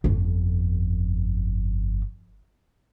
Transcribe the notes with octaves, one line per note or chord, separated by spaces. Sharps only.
G1 F2